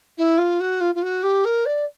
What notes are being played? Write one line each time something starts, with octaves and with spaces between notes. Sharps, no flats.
E4
F4
F#4
F4
F4
F#4
G4
A#4
D5